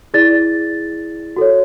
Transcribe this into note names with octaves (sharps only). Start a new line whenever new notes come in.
E4 G#4 D5 A6
F#4 A4 C#5